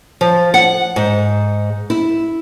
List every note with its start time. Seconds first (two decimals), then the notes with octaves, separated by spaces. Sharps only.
0.21 F3
0.54 F#5
0.96 G#2
1.90 E4